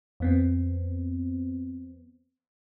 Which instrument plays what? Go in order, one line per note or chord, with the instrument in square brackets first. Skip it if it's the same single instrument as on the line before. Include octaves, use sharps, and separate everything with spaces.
[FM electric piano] F2 B3 C4